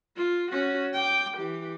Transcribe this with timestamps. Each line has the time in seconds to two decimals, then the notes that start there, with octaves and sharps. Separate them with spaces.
0.17 F4
0.52 C#4 F#4
0.94 G5 D6
1.38 E3 G4